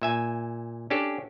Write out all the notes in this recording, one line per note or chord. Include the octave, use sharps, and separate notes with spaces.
A#2 E5 G#5
C#4 D4 G4 A4